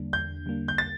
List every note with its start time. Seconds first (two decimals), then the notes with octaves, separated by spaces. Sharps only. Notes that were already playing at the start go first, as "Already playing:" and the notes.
Already playing: E2 D3 G3 A#3 D4
0.13 E2 G6
0.46 D3 G3 A#3 D4
0.68 G6
0.78 A6